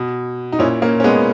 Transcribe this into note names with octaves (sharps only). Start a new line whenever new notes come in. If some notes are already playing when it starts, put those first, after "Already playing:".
Already playing: B2
D#4
A#2 C#4 E4
A#3 C#4
C#4
G#3 B3